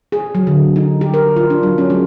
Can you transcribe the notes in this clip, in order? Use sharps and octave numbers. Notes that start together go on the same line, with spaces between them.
G#4
F#3
D3
D#4
G4
A#4
F4
D4
F#3
C#4
G#3